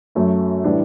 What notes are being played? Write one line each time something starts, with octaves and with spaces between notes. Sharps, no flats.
F#2 F#3 A3
A2 E3 G3 D4